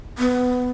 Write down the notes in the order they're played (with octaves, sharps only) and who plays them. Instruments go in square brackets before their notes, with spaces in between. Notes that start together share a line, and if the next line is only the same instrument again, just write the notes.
[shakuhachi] B3